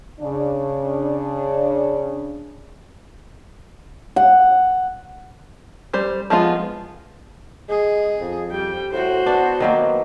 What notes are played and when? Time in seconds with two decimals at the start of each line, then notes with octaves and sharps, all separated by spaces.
0.21 C#3 D4
4.16 F#5
5.93 G3 C5
6.30 F3 G#3 B3 F4
7.69 G#3 G#4
8.20 F2
8.51 G3 G5
8.92 A2 F#4 C5
9.26 B3 D4
9.60 D#3 F#3 A#3